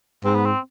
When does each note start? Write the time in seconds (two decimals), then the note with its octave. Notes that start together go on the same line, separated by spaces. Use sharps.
0.24 G#2 C4
0.35 B3
0.46 C4